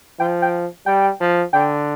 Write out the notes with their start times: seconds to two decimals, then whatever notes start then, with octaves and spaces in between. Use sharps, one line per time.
0.20 F3 G5
0.42 G5
0.86 G3 G5
1.20 F3
1.53 D3 G5